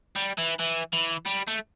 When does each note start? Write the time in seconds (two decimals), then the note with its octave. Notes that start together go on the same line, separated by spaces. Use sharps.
0.16 G3
0.38 E3
0.59 E3
0.93 E3
1.26 G3
1.47 A3